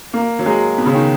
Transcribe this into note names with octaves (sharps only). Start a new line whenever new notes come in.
A#3
F#3
G#3
B2
C#3
D#3